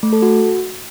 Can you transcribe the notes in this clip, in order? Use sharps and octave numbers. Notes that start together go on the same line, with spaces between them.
A3
A4
F#4